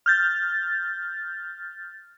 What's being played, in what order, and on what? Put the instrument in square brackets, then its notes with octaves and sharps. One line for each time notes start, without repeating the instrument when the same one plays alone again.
[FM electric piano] F6 G6 A6